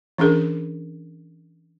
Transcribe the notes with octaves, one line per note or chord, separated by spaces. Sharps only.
E3 C#4 D4 G#4 A#4